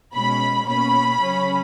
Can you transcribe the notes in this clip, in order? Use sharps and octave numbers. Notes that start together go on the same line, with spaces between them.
B2 G#3 C#4 B5
B2 A#3 C#4 B5
C#3 F#3 C#4